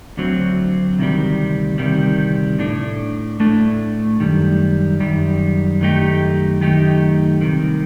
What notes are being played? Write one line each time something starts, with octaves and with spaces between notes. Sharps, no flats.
D2 D3 F#3 C4
D2 C3 D#3 G3
D2 C3 D#3 G3
A2 A3 D4
A2 A3 D4
F#2 D#3 G3
F#2 D#3 G3
F#2 D#3 A3 D#4 G4
F#2 D#3 A3 D#4 G4
C2 C3 D#3